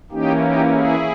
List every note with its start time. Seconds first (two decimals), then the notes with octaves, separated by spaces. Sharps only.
0.11 E3 A#3 C#4 D#4 G4
0.41 D#4 G4
0.71 E4 G#4